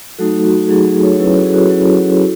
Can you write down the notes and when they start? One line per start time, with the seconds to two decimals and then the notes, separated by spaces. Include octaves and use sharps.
0.18 F#3 A3 D#4 F#4 A4
0.45 F#4
0.62 F#4
0.69 F#3 A3 D#4 G#4
1.03 A4 C#5
1.13 C#5
1.19 F#3 C#4 E4 G#4 B4
1.37 F#4 A4
1.46 G#4
1.53 F#4 A4
1.70 F#3 C#4 E4
2.20 E4